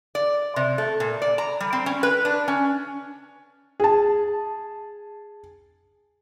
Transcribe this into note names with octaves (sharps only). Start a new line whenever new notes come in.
D5
C3
A3
A#2
D5
A#5
G3
C4
C#4
B4
D4
C#4
G#4 A5